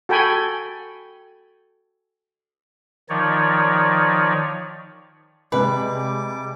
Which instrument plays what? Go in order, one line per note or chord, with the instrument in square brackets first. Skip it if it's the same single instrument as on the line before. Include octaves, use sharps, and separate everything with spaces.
[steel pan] F#4 A4 G5 G#5 B5
[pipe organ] D#3 F3 D#4 C#5 D5
[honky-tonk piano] C3 G#3 [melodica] G3 D6 [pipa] B4